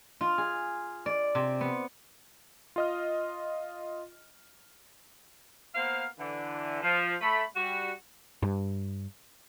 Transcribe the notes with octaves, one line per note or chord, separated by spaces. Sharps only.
F4
G#4
D5
C3
B3
F4 D#5 F6
A#3 B3 C5 F5
D3 E3
F3
A3 B5
G3 F#4
G2